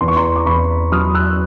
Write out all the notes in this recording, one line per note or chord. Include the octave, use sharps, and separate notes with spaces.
E2 C6
C#6
A#5 C6
D6
E2 B5 C#6
F#3 D#6 F6
E6 F#6